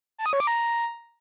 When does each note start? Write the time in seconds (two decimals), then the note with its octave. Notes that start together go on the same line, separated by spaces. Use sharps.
0.18 A5
0.26 D#6
0.33 C#5
0.40 D6
0.47 A#5